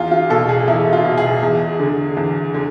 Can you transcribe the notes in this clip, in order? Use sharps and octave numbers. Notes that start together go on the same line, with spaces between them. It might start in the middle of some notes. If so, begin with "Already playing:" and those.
Already playing: E2 F4
F4
B2 A4
G#4
E2 E4
F4
B2
G#4
E2
D3
E2
D3